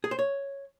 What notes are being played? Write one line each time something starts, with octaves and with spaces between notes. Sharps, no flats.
G#4
C5
C#5